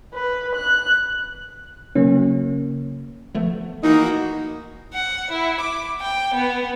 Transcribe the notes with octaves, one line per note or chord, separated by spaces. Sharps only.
B4
F#6
C#3 F#3 A#3 C#4
F3 A3 B3
E3 A#3 D#4 F#4
F#5
E4
D6
G5
B3